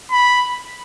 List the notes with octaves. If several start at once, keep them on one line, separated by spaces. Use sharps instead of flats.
B5